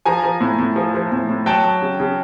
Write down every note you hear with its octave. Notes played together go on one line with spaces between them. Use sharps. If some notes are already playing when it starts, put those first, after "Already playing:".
F3 G#5 A#5
F3
A2
A2
F3
F3
A2
A2
F#3 G5 A5
F#3
C#3
C#3